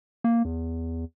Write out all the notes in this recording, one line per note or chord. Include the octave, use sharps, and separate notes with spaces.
A#3
E2